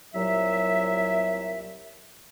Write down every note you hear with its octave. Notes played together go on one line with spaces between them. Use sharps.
C2 A#2 F#3 E5